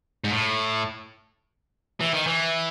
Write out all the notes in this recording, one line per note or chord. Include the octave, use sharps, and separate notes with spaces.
G#2
A2
E3
D#3
E3